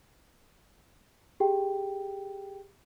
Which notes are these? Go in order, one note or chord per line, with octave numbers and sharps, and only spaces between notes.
G4 G#4 G5